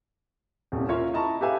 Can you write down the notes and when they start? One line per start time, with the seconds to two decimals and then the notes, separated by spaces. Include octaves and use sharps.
0.72 D#1 C2
0.89 C#4 F4 A#4 C#5 E5 F5
1.13 E4 D#5 A5 A#5 C#6
1.41 G4 A4 B4 E5 F5 G#5